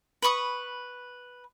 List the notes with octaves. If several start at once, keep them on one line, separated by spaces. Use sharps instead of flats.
B4 B5 C#6 D#6